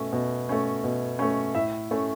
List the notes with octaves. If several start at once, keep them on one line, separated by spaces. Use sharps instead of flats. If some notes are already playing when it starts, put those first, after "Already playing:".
Already playing: B2 A3 C#4
B2
A3 C#4
B2
A3 C#4
A2 E5
A3 C#4